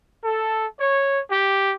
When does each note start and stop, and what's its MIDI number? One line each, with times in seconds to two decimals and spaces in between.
0.23 0.66 69
0.79 1.20 73
1.30 1.72 67